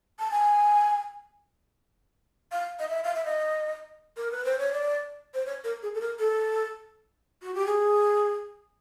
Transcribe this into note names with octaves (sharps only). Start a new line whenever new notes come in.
A5
G#5
F5
D#5
E5
F5
E5
D#5
A#4
B4
C5
C#5
D5
C5
C#5
A#4
G#4
A4
A#4
A4
F#4
G4
G#4